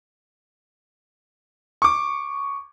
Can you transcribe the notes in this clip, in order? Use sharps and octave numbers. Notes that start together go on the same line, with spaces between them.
C#6 D6